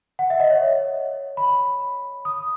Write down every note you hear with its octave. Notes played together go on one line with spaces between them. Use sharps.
F#5
E5
D#5
C#5
B5
D#6